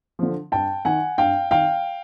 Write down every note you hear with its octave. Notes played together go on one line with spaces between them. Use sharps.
D3 F3
G2 G5 A5
D#3 F#5 G#5
G2 F5 G5
D#3 F5 G5